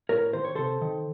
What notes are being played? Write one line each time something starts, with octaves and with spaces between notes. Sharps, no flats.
A2 A#4 C#5
D#3 C5
C#5
C3 A4 C5
D#3